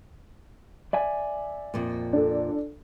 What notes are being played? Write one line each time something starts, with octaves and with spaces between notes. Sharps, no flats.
D5 E5 G#5
F2 A#2
D4 A4